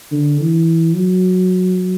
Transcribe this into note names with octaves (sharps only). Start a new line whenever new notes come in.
D3
E3
F#3